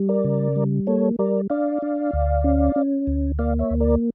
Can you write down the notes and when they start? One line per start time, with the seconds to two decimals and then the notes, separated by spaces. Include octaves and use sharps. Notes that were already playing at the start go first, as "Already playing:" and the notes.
Already playing: G3
0.09 A#4 D5
0.24 C#3
0.56 G3
0.87 A#3 A4 C#5
1.19 G3 A#4 D5
1.50 D4 D5 F5
1.82 D4
2.13 D2
2.44 C#4
2.76 C#4
3.07 D2
3.39 A#3 D5 F5
3.59 C#5 E5
3.71 D2
3.80 A#4 D5